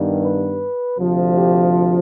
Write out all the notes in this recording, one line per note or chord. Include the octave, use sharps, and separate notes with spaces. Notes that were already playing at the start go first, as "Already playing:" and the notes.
Already playing: G2 D#3 G3 B3
B4
D2 C3 F3
G4